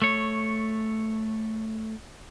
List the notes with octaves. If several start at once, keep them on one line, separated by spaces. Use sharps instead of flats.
A3 C#5